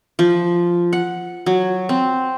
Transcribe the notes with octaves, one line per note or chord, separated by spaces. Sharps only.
F3
F#5
F#3
C4